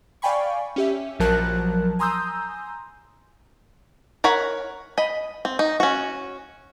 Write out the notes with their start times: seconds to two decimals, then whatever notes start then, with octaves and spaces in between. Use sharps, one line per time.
0.22 D5 F5 G5 G#5 B5 C#6
0.76 C#4 G4 E5
1.19 A#1 F3 F#3 A#4 A5 F#6
1.99 G#5 A#5 C6 D#6 E6 G6
4.24 A#4 C#5 F#5 B5
4.98 D#5 B5
5.45 C4
5.59 D#4
5.80 C#4 F#4